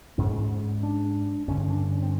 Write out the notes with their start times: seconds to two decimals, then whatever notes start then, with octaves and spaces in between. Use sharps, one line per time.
0.18 G#2 C#4
0.83 D4
1.48 G2 D3 C#4
1.59 C#4
1.70 D4
1.92 C#4
2.02 C4